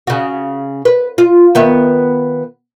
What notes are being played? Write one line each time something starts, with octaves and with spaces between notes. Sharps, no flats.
C#3 F#4
B4
F4
D#3 B3 E5